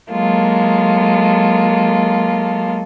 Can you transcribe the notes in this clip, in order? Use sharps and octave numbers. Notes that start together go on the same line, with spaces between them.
F#3 G#3 A#3 F4 A4